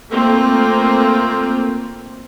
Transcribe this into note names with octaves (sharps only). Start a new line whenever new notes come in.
A3 A#3 C4 F4